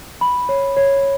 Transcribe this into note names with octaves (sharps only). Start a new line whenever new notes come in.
B5
C#5
C#5